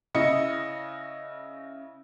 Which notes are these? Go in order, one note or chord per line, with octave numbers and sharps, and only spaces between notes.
C#3 E4 D#5 C#7